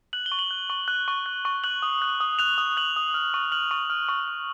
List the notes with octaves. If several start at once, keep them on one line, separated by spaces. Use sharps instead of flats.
F#6 F#7
G7
C#6
F#7
F#6
C#6
F#6
C#6
F#6
C#6
F#6 F#7
D#6
F#6
D#6
F#6 F7
D#6
F#6 F#7
D#6
F6
C#6
F6 F#7
C#6
F6
C#6
F6